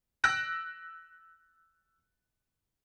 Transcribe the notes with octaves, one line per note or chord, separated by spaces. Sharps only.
E6 F#6 A#6 D7